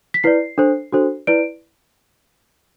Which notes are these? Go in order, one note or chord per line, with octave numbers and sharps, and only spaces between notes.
B6
E4 B4 D5 C7
D4 A4 C5
D4 F#4 A4 C5
E4 B4 D5 D7